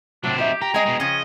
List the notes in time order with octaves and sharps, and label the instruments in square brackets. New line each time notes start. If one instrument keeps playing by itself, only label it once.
[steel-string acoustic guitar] A2 C3 [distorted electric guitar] F#3 C4 [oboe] D4
[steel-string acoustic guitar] D#4 D#5 E5 [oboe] G4
[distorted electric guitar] G4 [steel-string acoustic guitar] G5 [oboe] A#5
[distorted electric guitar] G#3 [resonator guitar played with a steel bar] D#5 G#5
[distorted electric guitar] B2 G#3
[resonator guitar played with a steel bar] C#3 F3 [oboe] C#4 [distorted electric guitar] D#5